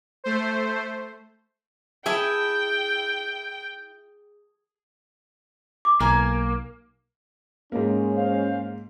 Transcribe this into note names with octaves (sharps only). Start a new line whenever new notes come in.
A3 C5
E4 G#4 E5 G5 A5
D6
B1 A#3 A#4 G#5
G#2 G#3 A#3 C#4
C5 F5